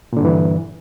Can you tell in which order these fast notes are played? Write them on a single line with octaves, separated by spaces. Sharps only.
A#2 D3 G2 E3